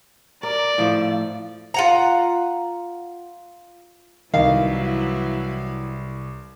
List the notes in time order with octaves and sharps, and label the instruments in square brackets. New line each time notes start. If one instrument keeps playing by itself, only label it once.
[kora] A#4 [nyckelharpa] D5
[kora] A2 F3 A3 [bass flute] F5
[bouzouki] F4 F#5 A#5
[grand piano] C2 [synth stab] D#3 [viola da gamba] E3 F#3 E4 [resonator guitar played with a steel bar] F5